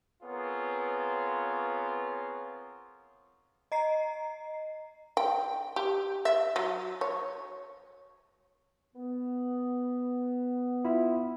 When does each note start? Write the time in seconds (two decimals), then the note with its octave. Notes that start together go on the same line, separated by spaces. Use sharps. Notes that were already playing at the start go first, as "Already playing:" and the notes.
0.23 B3 C4 F4 G#4 A#4 C#5
3.72 D#5 A#5 C7
5.17 G5
5.76 G4
6.25 E5
6.56 F#3
7.01 C#5
8.95 B3
10.85 E4 F4 E5